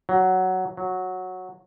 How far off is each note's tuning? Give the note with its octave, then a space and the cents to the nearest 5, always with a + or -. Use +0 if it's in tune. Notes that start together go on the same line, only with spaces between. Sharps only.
F#3 +5
F#3 -10